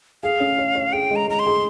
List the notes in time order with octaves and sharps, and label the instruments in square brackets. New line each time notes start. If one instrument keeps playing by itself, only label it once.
[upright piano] G#4 [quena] F5
[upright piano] C#4
C#5
C#5
[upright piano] G#4 [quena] G5
[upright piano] G#3
[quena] A#5
[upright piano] G#3 [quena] A#5
[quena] C6
[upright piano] G#4